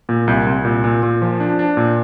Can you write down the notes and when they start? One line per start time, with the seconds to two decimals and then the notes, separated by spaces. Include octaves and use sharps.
0.09 A#2
0.28 C2
0.47 C2
0.65 A#2
0.84 A#2
1.03 A#2
1.22 F3
1.40 D4
1.59 D4
1.77 A#2